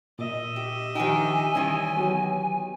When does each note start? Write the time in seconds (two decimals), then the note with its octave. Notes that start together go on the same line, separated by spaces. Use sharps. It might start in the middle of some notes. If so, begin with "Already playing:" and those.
0.19 A#2 D#5 E5
0.56 G4
0.95 D#3 F3 D#4 G4 G#5
1.55 D#3 E3 G3 C#4
1.97 F#3 B3 G4